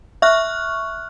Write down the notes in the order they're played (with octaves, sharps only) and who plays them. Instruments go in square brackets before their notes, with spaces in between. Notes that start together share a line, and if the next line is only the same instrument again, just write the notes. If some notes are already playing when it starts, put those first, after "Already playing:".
[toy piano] E5 [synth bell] C#6 F6 F#6